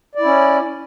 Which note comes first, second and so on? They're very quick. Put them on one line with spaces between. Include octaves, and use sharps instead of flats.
D5 E4 C#4